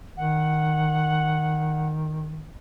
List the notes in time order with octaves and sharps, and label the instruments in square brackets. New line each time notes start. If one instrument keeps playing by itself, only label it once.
[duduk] D#3 [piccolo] F#5